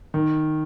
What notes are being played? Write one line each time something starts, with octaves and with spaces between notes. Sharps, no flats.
D#3